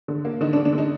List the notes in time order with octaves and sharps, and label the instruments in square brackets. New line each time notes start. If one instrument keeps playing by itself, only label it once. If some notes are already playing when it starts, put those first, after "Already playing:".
[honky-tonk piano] D3
A#3
D3 D#4
D4
D3
D4
D3
D#4